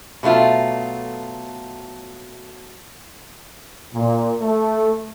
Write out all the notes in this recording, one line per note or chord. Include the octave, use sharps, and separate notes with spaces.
B2 F#3 A3 F4
A#2
A3